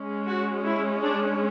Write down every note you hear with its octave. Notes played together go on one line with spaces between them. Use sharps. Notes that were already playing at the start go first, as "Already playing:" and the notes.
Already playing: G#3 C#4
F#4
E4
D4